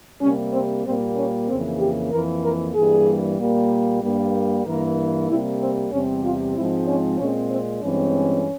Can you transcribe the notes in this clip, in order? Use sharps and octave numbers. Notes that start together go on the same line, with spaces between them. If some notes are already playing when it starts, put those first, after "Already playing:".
C3 G3 A#3 C#4
C4
A#2 G3 A#3 C4
C#4
F2 C#3 E3 A#3 C4
G4
F2 E3 A#3 A#4
A#4
G2 E3 G3 A#3 G#4
A#2 G3 A#3
G2 G3 A#3
G2 E3 A#3 A#4
C3 G3 A#3 E4
C4
E2 C3 G3 C4 C#4
F4
G#2 F3 G#3 C4 E4
C#4
A#2 G#3 C4 C#4
C4
G2 E3 G#3 C4 C#4